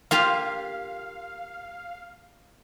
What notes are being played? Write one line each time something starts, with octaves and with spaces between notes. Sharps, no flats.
A#3 F4 G4 F5